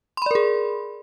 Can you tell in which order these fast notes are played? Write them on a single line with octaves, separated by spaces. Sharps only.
C6 B5 D5 A#4 G#4